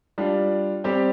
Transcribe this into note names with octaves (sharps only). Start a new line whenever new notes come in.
G3 D4 F4
G3 C4 G4